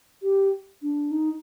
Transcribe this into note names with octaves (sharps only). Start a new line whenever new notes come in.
G4
D4
D#4